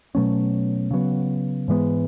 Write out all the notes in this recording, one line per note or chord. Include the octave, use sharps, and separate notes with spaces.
B2 F#3 A3 C#4
C#3 F#3 B3
G#2 E3 G#3 B3